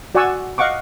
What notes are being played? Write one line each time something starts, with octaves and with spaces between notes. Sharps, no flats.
F#4 D5 F#5 G#5 C#6 E6
D#5 F5 F#5 C#6 D6